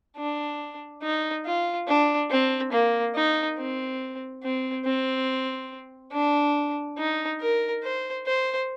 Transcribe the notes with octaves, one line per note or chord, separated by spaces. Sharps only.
D4
D#4
F4
D4
C4
A#3
D#4
C4
C4
C4
D4
D#4
A#4
C5
C5